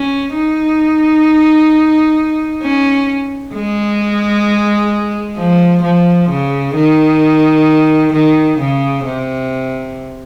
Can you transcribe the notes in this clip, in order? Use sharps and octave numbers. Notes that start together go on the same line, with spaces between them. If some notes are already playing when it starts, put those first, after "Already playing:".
Already playing: C#4
D#4
C#4
G#3
F3
F3
C#3
D#3
D#3
C#3
C3